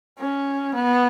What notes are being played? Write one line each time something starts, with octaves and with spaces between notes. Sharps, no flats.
C#4
B3